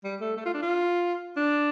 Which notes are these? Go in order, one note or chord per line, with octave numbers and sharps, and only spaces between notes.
G3
A3
A3
F4
D4
F4
D4